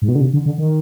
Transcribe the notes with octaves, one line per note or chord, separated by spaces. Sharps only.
G#2
B2
D3
C3
D3
D3
D#3